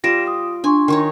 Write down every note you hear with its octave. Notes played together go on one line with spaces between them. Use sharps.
G3 F4 A#6 D7 E7
D#6
D4 G#5 C6 C#6
D#3 D#4 C#5